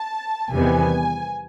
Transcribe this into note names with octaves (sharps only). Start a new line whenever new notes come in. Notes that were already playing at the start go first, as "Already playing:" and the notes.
Already playing: A5
E2 C3 D#3 G3 B3 G#5